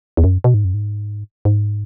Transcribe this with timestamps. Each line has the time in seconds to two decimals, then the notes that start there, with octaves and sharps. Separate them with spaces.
0.17 E2
0.24 F#2
0.44 B2
0.54 G#2
0.65 F#2
0.74 G#2
1.45 G#2